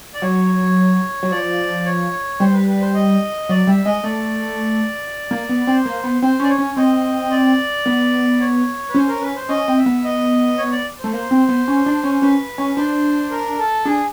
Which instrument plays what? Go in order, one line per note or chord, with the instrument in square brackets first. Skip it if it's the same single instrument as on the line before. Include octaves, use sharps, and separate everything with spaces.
[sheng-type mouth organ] D5
[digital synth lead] F#3 [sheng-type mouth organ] C#5
[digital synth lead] F#3
[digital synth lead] F3 [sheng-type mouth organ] D5
[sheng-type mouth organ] C#5
[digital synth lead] G3 [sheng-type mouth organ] C5
[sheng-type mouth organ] B4
B4
C5
D#5
[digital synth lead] F#3 [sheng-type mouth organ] D5
[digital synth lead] G3 [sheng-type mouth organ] E5
[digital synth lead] G#3 [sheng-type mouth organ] D#5
[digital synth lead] A3 [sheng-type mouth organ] D5
[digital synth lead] A#3
B3
[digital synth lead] C4 [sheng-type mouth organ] C5
[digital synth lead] A#3
B3
[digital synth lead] C4 [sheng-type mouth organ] C5
[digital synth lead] C#4 [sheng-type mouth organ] D5
[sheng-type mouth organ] C#5
[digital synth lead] C#4
[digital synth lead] C4 [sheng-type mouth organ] D#5
[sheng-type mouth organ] D5
[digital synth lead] B3
[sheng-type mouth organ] C#5
B4
[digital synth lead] C#4 [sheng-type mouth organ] C5
[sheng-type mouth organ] A#4
B4
C5
[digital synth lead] C#4 [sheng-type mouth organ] D#5
[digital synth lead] C4
[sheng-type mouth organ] E5
[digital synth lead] B3
[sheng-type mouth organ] D#5
C#5
D5
[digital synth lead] A3 [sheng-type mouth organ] C5
[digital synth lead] A#3 [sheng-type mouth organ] C5
[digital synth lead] C4
B3
C#4
D4
C#4
[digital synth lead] C#4 [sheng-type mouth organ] B4
[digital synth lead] C#4
[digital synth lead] D4 [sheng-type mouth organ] C5
[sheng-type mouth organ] A#4
A4
[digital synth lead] D4 [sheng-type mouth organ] G#4